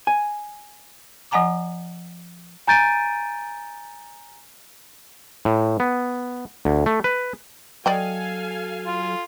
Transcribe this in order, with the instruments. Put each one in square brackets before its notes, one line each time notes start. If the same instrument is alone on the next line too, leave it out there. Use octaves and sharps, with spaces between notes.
[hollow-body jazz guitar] G#5
[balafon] F3 D#5 F#5 G#5 A#5 D6
[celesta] G#5 A#5 G6 A6 D7 D#7
[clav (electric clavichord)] A2
B3
D2
A3
B4
[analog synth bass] F#3 [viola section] A4 F5 G#5 [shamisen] D5 D#5 G5
[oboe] F4